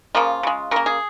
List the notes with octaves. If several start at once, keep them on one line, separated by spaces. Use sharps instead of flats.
C#3 F3 A#3 F4
C#3 G#3
C#3 A#3 A#4
G#4